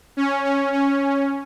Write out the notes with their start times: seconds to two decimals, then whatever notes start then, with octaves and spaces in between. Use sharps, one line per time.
0.17 C#4
0.45 C#4
0.73 C#4